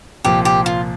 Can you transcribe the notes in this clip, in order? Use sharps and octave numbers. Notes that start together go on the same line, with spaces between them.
C2 A#2 F3 G4
G4
F4